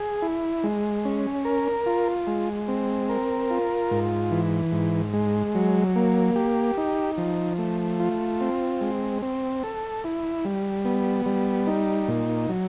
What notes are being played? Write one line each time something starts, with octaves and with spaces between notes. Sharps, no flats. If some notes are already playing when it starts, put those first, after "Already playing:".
Already playing: G#4
E4
G#3
C#4
A#4
F4
G#3
C4
A#4
F4
G#2
E3
G#2
G#3
F#3
A#3
G4
D#4
F3
A3
F4
C4
G#3
C4
A4
E4
G3
B3
G3
D#4
A#2
F#3